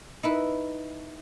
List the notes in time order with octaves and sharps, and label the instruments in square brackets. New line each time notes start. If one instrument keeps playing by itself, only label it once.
[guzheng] D#4 E4 B4